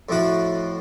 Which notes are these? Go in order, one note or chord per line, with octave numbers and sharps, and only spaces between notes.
F2 A2 F#4